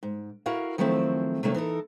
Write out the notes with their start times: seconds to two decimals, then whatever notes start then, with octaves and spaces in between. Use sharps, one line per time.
0.03 G#2
0.46 E4 F#4 A#4 F5
0.78 D#3 F3 F#3 A3 C4 E4
1.43 C3 D#3 F#3 A3 A#3 C#4
1.54 E3 D#4 A4 A#4